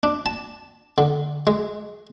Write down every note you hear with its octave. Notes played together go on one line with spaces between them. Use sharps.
D4
A5
D3
G#3